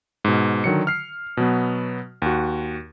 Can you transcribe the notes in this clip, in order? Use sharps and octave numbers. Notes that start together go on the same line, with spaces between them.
G#2 B2
D3 D#3 F#3 C#7
F6 C7
B2 F#3 B3
D#2 F#4